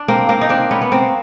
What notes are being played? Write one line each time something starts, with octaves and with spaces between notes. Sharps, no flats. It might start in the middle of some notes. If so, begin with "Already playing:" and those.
Already playing: D4
A#3 C4
A#3 C4
D#4
C4 D4
B3 C#4
B3
A#3 C4